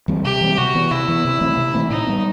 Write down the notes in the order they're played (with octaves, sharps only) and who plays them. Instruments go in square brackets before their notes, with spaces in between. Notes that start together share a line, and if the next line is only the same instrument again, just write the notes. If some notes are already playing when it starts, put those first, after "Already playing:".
[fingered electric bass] E3 G3 C4
[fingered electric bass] C3 [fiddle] G4
[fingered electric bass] E3 G3 C4
[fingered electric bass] C3 [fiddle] F#4
[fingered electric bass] E3 B3
[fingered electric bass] C3 [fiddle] E4
[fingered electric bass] E3 B3
C3
E3 A3 C4
C3
E3 A3 C4
[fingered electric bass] A2 [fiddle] D#4
[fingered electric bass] G3 B3